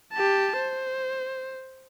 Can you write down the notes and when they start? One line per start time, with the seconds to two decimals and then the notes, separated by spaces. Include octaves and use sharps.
0.13 G4 A5
0.57 C5